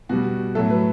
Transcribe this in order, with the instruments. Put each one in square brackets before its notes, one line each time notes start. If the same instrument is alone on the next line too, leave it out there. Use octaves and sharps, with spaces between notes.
[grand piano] B2 G3 F#4
A2 F#3 A3 A4
B4